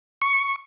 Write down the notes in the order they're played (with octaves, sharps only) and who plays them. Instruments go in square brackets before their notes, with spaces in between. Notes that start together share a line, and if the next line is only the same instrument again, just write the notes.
[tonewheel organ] C#6